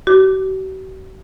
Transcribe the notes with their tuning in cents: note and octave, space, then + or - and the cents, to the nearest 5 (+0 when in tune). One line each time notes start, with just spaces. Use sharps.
F#4 +45 D6 +0